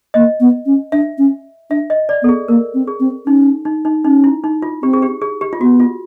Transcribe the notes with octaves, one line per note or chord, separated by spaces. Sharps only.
A#3 D#5
B3
C#4
D4 E5
C#4
D4 E5
D#5
D5
B3 A4
G#4
A#3 A#4
C4
G#4
C4
C#4 D#4
D#4
D#4
C#4 D#4
E4
D#4
F4
C4 G4
G#4
G4
G#4
G4
F4
B3 F#4
F4